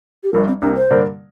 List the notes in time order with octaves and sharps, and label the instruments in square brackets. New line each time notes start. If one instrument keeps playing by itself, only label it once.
[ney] G4
[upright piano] G1 G2 F3 [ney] A#4
[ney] C4
[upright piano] C2 C3 A#3 [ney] D4
[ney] C5
[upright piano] G2 D3 A#3 D4 A#4